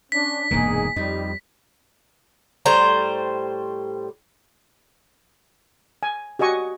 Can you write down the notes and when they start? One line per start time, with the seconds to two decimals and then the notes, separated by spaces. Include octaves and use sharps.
0.12 C#4 D4 B6
0.51 E1 G2 C3 A#3 D#4 G#4
0.96 F2 G3 D#4
2.66 A2 G3 C5 A#5
6.03 G#5
6.39 F#4 G4 D#5 G#5 C#6